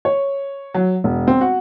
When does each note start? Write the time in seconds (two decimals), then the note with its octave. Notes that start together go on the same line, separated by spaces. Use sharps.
0.05 C#5
0.75 F#3
1.04 E1
1.28 C4
1.41 F#4